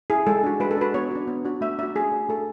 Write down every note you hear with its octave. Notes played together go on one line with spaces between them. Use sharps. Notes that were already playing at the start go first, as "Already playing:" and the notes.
E4 G#4
G#3 A4
D4 F#4
G#3 B4
A4
D4 F#4 B4
B3 C#5
D4 F#4
B3
D4 F#4
A3 E5
D4 F#4 E5
A3 G#4
D4 F#4
A3 A4